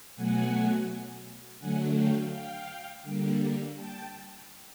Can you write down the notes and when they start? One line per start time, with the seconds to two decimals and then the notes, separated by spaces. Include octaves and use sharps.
0.16 B2 F#3 A3 F#5 G#5
1.60 D3 F#3 A3 F#5 G#5
1.95 F5 G5
2.31 F5 G5
3.03 D3 G3 A#3
3.75 G5 A5